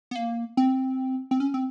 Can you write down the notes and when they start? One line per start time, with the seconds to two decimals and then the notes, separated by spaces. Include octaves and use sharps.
0.11 B3
0.15 A#3
0.57 C4
1.31 C4
1.40 C#4
1.54 C4